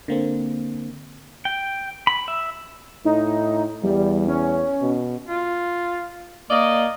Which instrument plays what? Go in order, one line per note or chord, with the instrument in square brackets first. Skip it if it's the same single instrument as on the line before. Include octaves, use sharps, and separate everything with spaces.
[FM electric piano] D3 A#3 C4
[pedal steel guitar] G5
B5
E5
[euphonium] A2 [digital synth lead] D#4
[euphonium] E2 [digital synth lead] G3
[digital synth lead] C#4
[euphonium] B2
[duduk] F4
[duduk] A#3 [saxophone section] D5 D#5